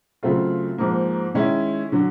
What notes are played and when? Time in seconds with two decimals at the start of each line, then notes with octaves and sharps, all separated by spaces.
0.23 C#3 F#3 A3 C4 F4
0.78 G#2 F3 A#3
1.34 D#3 G#3 C#4 E4
1.92 D3 F#3